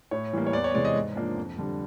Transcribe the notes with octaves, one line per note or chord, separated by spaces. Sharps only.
A2 C#5
E3 G3 A#3
C#5
E2 D5
C#5
C3 E3 G#3 D5
D#5
G#2
F3 A#3 D4
F2
D3 G3